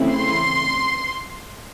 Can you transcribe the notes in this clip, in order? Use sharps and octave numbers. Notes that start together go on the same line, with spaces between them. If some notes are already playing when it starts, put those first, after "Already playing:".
Already playing: C#3 E3 A3 C4 E4
C6